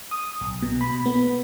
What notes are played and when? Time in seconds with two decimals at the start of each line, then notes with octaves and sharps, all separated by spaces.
0.11 D#6
0.41 B1
0.62 B2
0.81 B5
1.06 B3